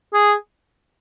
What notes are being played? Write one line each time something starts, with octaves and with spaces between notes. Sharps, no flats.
G#4